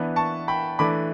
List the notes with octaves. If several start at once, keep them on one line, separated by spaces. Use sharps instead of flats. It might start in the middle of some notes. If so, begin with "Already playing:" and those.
Already playing: E3 B3 D4
A5 C#6
G5 B5
E3 A3 D4 B5 D6